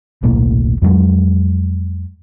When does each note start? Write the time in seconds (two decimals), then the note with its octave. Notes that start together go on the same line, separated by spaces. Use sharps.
0.23 D#1 B1 A2 A#3
0.82 F2 F#3 G#3